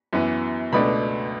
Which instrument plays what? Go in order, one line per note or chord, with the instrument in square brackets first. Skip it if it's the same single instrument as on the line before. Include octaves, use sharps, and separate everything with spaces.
[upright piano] F#2 E3 B3
C#2 B2 A3 D4 B5